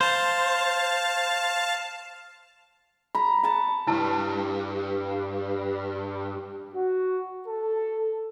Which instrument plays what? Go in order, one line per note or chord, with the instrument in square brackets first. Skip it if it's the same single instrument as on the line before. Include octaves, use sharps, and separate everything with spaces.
[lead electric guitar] C5 [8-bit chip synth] F5 A5
[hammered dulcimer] A#5 [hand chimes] B5
[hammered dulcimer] F#5 A5
[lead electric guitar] C#2 G2 [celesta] E4 A5
[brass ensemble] F#4
A4